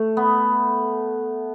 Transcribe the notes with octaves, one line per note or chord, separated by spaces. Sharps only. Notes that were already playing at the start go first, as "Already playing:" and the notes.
Already playing: A3
B3